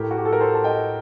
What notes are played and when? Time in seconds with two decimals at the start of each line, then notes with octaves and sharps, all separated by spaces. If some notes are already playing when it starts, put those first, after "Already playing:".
Already playing: A2 A3 G4 A#4
0.11 F#4
0.18 G4
0.25 A4
0.32 A#4
0.40 A4 C5
0.54 A5
0.64 D#5 G5